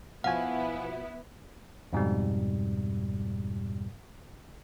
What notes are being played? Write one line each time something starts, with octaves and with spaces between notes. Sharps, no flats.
B2 F3 B3 E4 F#4 F5 F#5 G#5
F2 G#2 B2 G3